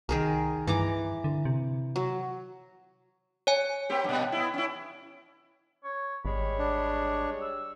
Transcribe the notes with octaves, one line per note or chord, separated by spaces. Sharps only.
C2 D#3 G#4 A#4
G2 E3 A#5 D6
D3
C3
F#3
C#5 G#5
A#3 C4 G4
G2 A#2
B3 E4
C#4 E4
C#5
G#1 G3 G#3 C#5 B5
D4
E6